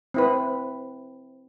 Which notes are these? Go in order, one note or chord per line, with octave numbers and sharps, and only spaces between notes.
C4 E4 B4